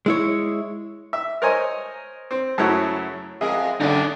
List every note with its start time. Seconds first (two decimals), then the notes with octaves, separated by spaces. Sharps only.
0.06 G#3 E4 C#5
1.13 E5
1.42 A#4 C5 C#5 D#5 G#5
2.31 C4
2.58 F#2 C#3 F#3 A3 E4 C#5
3.41 F2 G#3 G#4 A#4 D#5 E5
3.81 F#2 A2 D3 C#4 D#4 D5